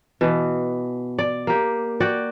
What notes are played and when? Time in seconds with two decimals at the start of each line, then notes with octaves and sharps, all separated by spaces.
0.21 B2 E3
1.19 D5
1.47 A#3 G4
2.00 F#4 D5 G5